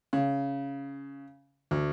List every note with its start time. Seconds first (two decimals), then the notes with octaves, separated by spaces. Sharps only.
0.13 C#3
1.71 D2